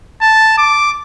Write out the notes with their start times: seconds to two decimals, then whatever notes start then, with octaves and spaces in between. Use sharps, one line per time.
0.22 A5
0.58 D6